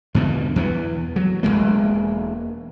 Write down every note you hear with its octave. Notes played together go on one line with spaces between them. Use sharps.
E2 G2 B2 D3
E2 E3 B3
F#3
E1 F#2 G#3 A#3